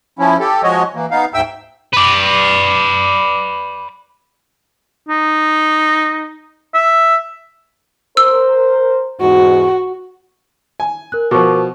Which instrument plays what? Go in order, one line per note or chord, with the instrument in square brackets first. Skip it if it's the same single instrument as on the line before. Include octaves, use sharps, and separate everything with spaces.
[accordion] F3 C#4 E4
G4 A4
F3 G#3 F#4 C#5 D#5
E3 A#3
B3 D#4 F5
D2 G#2 E5 G5 E6
[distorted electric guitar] B4 D5
[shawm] D#4
E5
[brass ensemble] A#4 C5 [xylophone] E6
[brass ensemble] E2 G#2 [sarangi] F#4
[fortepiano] G#5
[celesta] A#4 F#6
[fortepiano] B2 F3 [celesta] A#4 C#6 D6